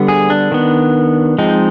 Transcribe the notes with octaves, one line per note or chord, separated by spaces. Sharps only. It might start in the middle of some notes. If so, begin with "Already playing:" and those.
Already playing: D3 G3 B3
G#4
D4
D#3 B3
F3 G#3 C4 D#4